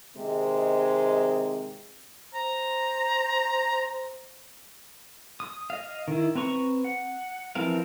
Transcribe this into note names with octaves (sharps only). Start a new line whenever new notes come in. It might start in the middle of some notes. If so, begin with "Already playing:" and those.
C3 D#3 G#3 C4
C5 A#5
D#6
D#5 F5
D#3 E4
C4 B4 A#5 C#6
F#5
E3 F3 C4 A#4 F5